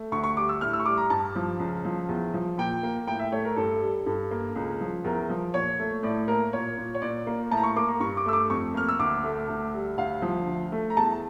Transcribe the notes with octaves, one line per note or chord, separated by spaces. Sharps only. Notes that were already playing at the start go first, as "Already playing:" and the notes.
Already playing: A3
D2 C#6
C#6
G3 D6
E6
A2 F6
E6
C#6
G3 D6
A#5
G2 A5
F3
C#2
F3
E2
F3
A#2 G5
A#3
A2 G5
E5
A3 C#5
A#4
G2 A4
G3
G2 A4
A#3
C#2
F3
E2 A#4
F3
A#2 C#5
A3
A2 D5
A#3 A#4
A#2 C#5
A#2
C#5
A#2 D5
A#3
A2 A5
A#5
C#6
A#3 D6
A#5
G2 C#6
D6
A3 E6
D6
F2 C#6
A#3 F6
E6
D2 D6
A3
D2
G3
D2 F5
F3
D2
A3
A#5
E2 A5